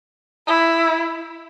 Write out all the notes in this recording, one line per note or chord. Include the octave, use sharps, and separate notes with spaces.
E4